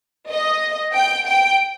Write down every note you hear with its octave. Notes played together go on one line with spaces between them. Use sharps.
D#5
G5
G5